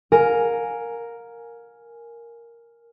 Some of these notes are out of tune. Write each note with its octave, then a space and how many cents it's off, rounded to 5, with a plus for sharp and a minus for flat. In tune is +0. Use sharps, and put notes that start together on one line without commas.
A#4 +0 F5 +35 G#5 +0